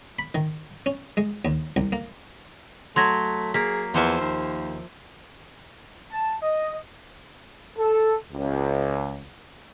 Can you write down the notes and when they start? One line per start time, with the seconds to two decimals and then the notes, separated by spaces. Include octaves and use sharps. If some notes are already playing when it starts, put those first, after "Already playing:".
0.19 B5
0.35 D#3
0.86 C#4
1.17 G#3
1.45 D#2
1.76 C2
1.92 A#3
2.96 F#3 A3 C6 G#6 A#6
3.54 A#3 G#4 B6
3.94 E2 F3 C5 E5
4.20 D#2
6.12 A5
6.42 D#5
7.78 A4
8.33 C#2